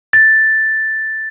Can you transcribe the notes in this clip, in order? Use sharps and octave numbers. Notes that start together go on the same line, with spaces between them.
A6